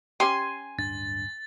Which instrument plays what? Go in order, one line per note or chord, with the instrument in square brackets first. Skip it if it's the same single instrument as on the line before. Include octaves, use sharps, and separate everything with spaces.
[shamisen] C#4 G4 [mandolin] G#5 C6
[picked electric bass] D1 G2 D4 [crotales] A6